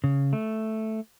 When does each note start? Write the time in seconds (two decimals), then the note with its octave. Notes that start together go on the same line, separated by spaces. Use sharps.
0.04 C#3
0.33 A3